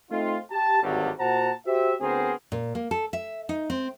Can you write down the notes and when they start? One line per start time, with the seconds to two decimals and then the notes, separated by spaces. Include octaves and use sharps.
0.10 A3 C4 D#4 F4
0.50 G4 A5
0.81 G#1 D2 G2 D3 F#3 G3
1.19 A#2 F#4 C5 F#5 A5 A#5
1.66 F#4 G4 C5 E5
2.01 D2 B3 C4 G#4 A#4 C5
2.52 A#2
2.75 A#3
2.91 A4
3.13 E5
3.49 D#4
3.70 C4